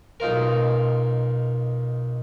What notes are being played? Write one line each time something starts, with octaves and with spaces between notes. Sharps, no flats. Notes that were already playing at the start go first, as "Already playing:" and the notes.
B1 D#4 F4 A#4